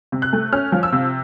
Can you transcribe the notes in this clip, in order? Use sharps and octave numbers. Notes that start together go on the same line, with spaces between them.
C3
F#6
A3
C#4 F6
F3
E6
C3